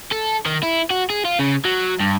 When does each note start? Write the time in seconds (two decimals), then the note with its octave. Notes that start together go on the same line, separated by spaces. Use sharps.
0.12 A4
0.46 D#3
0.63 E4
0.90 F#4
1.10 G#4
1.25 F4
1.39 C#3
1.65 F#3
2.00 G2